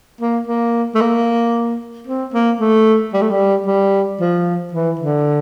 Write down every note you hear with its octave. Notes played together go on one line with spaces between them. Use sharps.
A#3
A#3
A3
A#3
C4
A#3
A3
G3
A3
G3
G3
F3
E3
D3